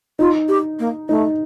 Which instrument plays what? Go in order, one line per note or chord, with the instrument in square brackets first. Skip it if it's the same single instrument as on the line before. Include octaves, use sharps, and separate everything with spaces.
[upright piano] D#4 [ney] F4
[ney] G4
A#3
[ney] A3 [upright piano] D#4